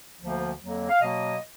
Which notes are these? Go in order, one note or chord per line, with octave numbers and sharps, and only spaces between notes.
D2 D3 F3 A#3
F2 D3 F#3 A#3
F5
B2 F#3 A#3 D#5